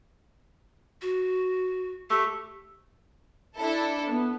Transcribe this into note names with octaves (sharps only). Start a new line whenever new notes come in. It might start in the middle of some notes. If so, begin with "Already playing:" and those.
F#4
A3 G4
D4 E4 A4
B3